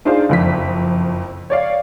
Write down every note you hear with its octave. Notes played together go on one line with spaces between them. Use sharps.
D4 D#4 F4 G#4 C5 F5
F#1 F2 B6
C#5 D5 F5